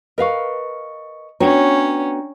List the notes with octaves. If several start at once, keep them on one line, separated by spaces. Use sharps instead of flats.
A#4 B4 D#5 F5 C#6
B3 C#4 D4 F#4 C#5 G5 A#5